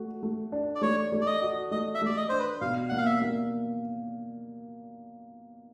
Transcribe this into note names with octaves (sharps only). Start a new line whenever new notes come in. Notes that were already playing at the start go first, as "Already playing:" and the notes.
Already playing: A3 F#4
A3
D4
D5
A3 C#5
A3
D5
D#5
F#4
A3 D#5
E5
A3 D5
D#5
D4 C5
B4
B2 F5
A#3 F#5
F5
E5
A#3